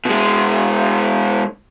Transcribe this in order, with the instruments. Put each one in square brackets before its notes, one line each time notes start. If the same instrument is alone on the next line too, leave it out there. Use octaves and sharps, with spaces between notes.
[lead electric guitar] B2 G#3